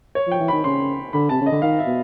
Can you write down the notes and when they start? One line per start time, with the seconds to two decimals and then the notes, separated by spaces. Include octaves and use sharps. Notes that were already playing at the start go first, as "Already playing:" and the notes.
0.15 C#5
0.27 F3
0.31 G5
0.40 E3
0.48 D#3 B5
0.64 C#3 C6
1.13 D3 B5
1.29 C3 A5
1.41 C#3
1.46 D#5
1.52 D3
1.62 D#3 F5
1.79 E5
1.87 B2